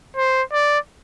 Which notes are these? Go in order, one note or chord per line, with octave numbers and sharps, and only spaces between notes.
C5
D5